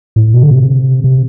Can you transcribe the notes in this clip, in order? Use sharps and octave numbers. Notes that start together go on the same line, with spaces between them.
A2
B2
D3
C3
C3